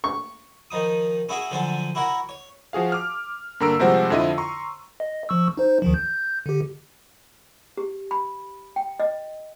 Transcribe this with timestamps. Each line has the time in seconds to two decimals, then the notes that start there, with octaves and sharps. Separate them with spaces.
0.04 C#6
0.71 D#3 F3 D#4 D#6
1.29 C#4 E4 F#4 G#4 E5
1.51 D3 F3 F#3 C5 G#5 A5
1.95 E4 F#4 A#4 C#5 F#5
2.29 C#5
2.73 F3 F#4 G#4 F5
2.92 D6 F6
3.60 G2 D3 A#3 A#5 E6 D7
3.79 C3 F3 G3 G#3 F#4 C5
4.10 F2 D3 E4 F4 D#5 D#7
4.38 A#5 C6 C#6
5.00 D#5
5.29 F3 C#6 E6
5.57 D#4 C5
5.82 D2 D#3 F3
5.94 G6
6.46 D3 G4
7.77 G4
8.11 B5
8.76 G5
9.00 D#5